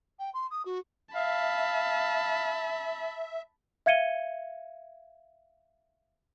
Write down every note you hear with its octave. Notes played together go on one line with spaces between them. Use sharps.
G5
C6
D#6
F#4
E5 F5 A5 B5
E5 F5 G#6 C#7 D#7 G7